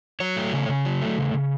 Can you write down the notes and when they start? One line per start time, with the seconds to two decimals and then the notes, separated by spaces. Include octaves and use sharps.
0.20 F#3 C#5
0.37 A3
0.53 C#3
0.69 C#3
0.85 F#3
1.02 A3
1.18 C#3
1.34 C#3